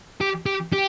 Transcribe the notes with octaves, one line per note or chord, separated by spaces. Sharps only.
G4
G4
G4